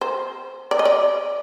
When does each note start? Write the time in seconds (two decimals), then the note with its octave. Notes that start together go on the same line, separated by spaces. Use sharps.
0.01 C5
0.71 D5
0.79 D#5
0.85 D5